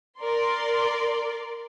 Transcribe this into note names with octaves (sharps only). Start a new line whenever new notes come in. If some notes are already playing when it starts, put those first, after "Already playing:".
A#4 D5 C6